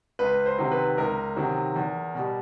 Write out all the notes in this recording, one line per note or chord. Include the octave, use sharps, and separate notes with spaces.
C#2 B4
C5
C3 D#3 F#3
B4
C#2 A#4
C3 D#3 F#3
E2
B2 G3